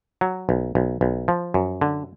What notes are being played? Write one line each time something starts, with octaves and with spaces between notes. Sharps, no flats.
F#3
B1
B1
B1
F3
F#2
D3